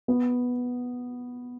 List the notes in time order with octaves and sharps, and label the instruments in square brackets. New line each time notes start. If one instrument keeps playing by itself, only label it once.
[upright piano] B3